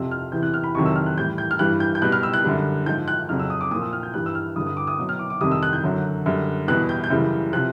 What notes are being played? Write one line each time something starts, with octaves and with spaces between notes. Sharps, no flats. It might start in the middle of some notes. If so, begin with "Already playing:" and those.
Already playing: F2 C3 F3 E6
F6
E2 C3 E3 G6
F#6
F6
B5
F2 C3 D#3 F#3 C#6
E6
F6
F#6
A2 E3 G3 G6
G6
F6
G2 E3 G3 F#6
G6
G6
B2 G3 F#6
F6
E6
F#6
F#2 D3 G3
G#2 F3 G6
F#6
F2 C#3 F#3 F6
E6
D#6
D6
A#2 F3 D#6
E6
F6
G6
G2 E3 G3 F#6
E6
F6
G2 D3 G3 D#6
D#6
D6
D#6
B2 F#3
F6
D6
D6
F2 C3 D#3 G3 D#6
E6
F#6
G6
F#2 D3 F#3
F#2 D3 G3
E2 B2 G3 F#6
G6
G6
F#2 C#3 E3 G3
C3 F3 F#6